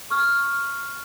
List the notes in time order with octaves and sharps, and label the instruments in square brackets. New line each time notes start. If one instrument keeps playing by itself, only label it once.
[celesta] C#6 F6